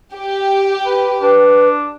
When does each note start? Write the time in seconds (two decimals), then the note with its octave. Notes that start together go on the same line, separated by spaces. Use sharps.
0.15 G4
0.86 B4
1.22 D4 B4